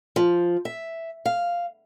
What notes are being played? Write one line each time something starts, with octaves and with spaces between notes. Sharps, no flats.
F3
E5
F5